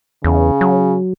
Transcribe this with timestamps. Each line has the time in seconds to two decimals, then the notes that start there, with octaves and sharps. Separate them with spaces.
0.24 E2 C#3
0.61 F#3